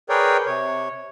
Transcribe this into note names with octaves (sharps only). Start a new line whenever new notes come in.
G#4 A#4 B4 C#5 D5 G5
C3 C#5